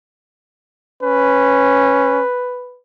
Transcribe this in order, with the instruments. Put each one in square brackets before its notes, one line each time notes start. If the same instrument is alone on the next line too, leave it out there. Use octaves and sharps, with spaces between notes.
[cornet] C#4 [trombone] B4